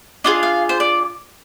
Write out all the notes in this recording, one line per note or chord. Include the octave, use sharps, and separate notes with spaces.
D4 F4 G#4 D#5
F5
C5
D5